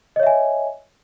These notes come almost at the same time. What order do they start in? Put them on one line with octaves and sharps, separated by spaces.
D#5 C#5 E5 G#5